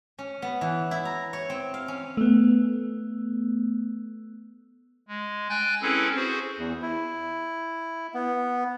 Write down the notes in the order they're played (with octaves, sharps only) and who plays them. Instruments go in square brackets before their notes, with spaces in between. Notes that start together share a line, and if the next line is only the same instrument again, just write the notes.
[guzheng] C#4
B3
E3
E4
A#5
C#5
C4
F5
C#4
[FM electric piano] A3 B3
[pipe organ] G#3
G5 G#5 F#6 G6 A6
C4 C#4 E4 G#4 A4 B4
F#4 G#4 C5
[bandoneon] E2
E4
B3